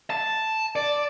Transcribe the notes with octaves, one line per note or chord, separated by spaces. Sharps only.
A5
D5